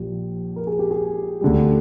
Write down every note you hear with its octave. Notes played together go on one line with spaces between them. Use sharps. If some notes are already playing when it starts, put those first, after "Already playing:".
Already playing: A#1 A#2 F3 G4
A#4
G#4
G4
G#4
D2 D3 G3